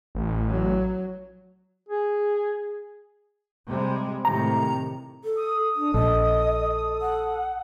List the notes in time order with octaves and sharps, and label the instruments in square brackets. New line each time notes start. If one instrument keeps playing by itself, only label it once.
[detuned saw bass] A1
[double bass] F#3
[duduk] G#4
[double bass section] C3 G3 G#3
[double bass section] A2 C3 D#3 [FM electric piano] A#5
[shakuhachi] A4
[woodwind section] D#6
[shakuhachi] D4
[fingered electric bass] A#1 [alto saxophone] A4 [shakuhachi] D#5
[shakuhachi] F#5